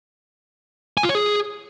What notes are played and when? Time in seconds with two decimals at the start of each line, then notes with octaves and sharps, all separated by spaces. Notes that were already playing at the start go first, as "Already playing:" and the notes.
0.97 G#5
1.03 F4
1.09 C#5
1.15 G#4